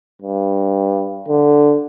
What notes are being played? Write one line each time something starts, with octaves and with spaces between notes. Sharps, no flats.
G2
D3